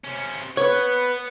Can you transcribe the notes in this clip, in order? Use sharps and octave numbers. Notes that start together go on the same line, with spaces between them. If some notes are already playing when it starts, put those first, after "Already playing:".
C3 C#4
B3 B4 C#5 F#5